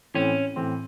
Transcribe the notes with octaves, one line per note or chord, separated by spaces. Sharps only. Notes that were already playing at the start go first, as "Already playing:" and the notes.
A2 E3 C4 C#4
A2 E3 C4